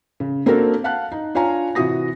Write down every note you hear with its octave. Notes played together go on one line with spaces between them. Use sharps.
C#3
A#3 C4 D4 F#4 A4 A#4
F5 F#5 A5 F#6
D#4
D4 F4 C#5 F5 G#5 A#5
C3 E3 F#4 D#6 A#6